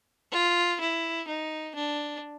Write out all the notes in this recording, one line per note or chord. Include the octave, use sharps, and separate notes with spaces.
F4
E4
D#4
D4